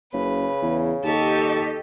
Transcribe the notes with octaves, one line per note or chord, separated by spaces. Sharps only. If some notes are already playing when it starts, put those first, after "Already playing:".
F#1 C#3 B4
E2
D#2 G4 A4 D#5 A5 C#6